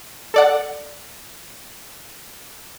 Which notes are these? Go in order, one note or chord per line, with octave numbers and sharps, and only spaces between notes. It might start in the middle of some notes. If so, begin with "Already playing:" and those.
A4 D5 F#5